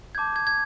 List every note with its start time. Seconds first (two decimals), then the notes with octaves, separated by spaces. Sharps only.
0.15 A5 D6 G6 G#6
0.36 G#6
0.47 G#6